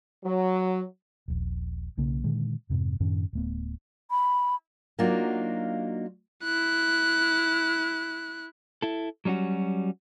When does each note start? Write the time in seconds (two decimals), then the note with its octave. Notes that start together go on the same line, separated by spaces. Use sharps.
0.25 F#3
1.28 D#1 A#1
1.97 B1 C#3 A#3
2.24 A#2 D3 D#3 G#3
2.70 F2 G#2 C3
3.00 F#2 A2 D#3 C#4
3.33 D1 A3 B3
4.11 B5
4.99 F#3 A#3 D4 D#4 F4 F#4
6.43 E4 F#6
8.82 E4 A4
9.25 F#3 G3 C#4 F4 F#4